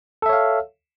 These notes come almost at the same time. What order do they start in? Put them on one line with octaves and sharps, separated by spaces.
A4 E5 C#5 F5